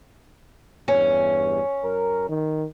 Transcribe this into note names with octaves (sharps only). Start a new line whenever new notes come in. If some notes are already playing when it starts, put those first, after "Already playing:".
E2 G2 C#4
F#2 A#4
D#3